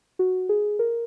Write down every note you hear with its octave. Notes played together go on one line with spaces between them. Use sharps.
F#4
G#4
A#4